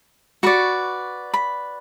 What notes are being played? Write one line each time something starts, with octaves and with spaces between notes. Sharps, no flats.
F#4 B4 D5 C#6
B5